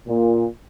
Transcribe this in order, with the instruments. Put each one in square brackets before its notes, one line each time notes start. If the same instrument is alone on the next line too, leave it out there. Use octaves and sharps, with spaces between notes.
[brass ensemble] A#2